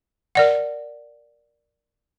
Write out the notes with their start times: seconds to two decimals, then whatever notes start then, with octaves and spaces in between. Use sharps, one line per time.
0.35 A#4 D5 F#5